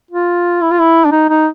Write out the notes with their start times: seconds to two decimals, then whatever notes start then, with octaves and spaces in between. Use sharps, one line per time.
0.11 F4
0.62 E4
0.71 F4
0.80 E4
1.05 D4
1.12 D#4
1.29 D#4